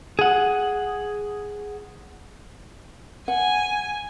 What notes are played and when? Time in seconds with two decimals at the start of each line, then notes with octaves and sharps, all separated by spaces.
0.19 G#4 F#5
3.28 F#5 G#5